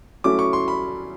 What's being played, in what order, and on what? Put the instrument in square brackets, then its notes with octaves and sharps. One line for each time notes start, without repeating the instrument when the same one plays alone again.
[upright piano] F#3 A3 C#4 E4 [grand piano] D6
[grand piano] C#6
C6
B5